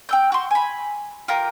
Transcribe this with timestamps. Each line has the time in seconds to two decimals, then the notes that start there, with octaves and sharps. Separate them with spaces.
0.09 G5 E6 G6
0.32 F#4 C6
0.51 G#5 B5
1.28 F4 G4 A#4